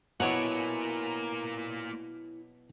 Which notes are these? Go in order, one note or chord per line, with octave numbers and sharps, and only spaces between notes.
B2 F#3 A#3 E4 C#5 D5 F#5 G#5